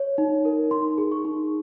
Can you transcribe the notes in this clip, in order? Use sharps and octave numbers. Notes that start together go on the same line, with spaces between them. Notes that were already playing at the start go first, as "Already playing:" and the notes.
Already playing: C#5
D#4
A#4
D#4 C6
G#4
C#6
D#4